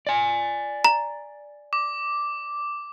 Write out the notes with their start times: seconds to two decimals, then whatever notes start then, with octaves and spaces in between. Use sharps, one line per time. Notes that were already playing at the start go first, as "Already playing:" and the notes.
0.07 D5 G#5
0.84 A#5
1.73 D6